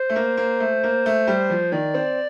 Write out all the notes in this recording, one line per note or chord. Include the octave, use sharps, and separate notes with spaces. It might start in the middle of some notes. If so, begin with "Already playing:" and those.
Already playing: C5
A3
A#3
A#3
A3
A#3
A3
G3
F3
D#3 D5
C4